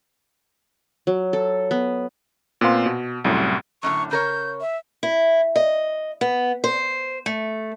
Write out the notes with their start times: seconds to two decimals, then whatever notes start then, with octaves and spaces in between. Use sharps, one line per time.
1.07 F#3
1.33 A4
1.71 B3
2.61 A#2 B3 C4 C5 F5 C6
2.86 B2
3.24 C2 F#2 A2
3.83 F#2 A2 D3 C#6
4.11 C#3 A#4 C#5 G6
4.61 E5
5.03 E4
5.56 D#5
6.21 B3
6.64 C5
7.26 A3